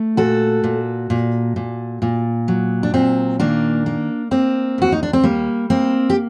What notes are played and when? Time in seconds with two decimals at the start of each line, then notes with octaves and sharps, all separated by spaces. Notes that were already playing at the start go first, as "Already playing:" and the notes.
Already playing: A3
0.17 A#2 F#4 A4
0.64 A#2
1.10 A#2
1.56 A#2
2.02 A#2
2.48 F#3
2.83 D4
2.94 A#2 C4
3.40 D#3 A#3 D4
3.86 A#3
4.31 A#3 C4
4.78 D#2 F#4
4.92 D#4
5.03 D4
5.13 C4
5.24 G3 A#3
5.70 A#3 C4
6.10 G4